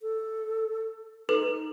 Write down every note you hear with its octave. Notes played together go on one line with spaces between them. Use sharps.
A4
D#4 A4 B4